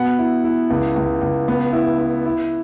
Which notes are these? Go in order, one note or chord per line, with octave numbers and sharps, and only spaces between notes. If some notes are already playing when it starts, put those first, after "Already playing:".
Already playing: B2 B3 F#5
E4
E4
C#2
C#2
C#2
B3
E4
E4
E4